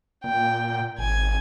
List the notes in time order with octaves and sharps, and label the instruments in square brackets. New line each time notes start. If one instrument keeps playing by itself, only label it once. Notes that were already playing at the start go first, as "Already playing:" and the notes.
[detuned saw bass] A#2 [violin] G5
[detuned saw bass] G#1 [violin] G#5 G#6